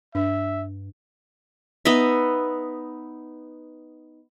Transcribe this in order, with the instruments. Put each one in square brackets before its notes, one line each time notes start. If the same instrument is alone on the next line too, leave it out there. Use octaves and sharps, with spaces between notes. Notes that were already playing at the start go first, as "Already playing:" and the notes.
[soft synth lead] G2 [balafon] D4 [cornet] E5
[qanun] B3 D#4 D#5 E5